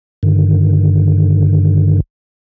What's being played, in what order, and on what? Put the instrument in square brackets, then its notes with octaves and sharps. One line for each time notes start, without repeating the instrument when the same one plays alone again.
[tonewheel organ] G2 D3 D#3